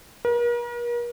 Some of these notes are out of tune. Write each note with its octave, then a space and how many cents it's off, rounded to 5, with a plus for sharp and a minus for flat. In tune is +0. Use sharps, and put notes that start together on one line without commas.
A#4 +40